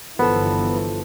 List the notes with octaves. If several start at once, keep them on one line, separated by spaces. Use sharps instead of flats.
G1 E3 F3 B3 A4